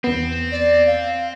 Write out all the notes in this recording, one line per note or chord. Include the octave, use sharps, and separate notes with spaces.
E2 B3 C4
D5
F5